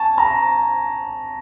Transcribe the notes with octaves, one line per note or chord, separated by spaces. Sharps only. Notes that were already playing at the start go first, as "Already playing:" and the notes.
Already playing: G#5 A5 C#6
A#5